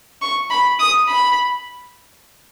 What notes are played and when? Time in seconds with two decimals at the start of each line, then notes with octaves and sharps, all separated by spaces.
0.22 C#6
0.50 B5
0.79 D#6
1.08 B5